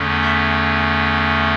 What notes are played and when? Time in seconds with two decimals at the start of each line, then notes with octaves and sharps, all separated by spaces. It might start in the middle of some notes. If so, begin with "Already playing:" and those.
Already playing: E2 D3 A3 C#4
0.22 E5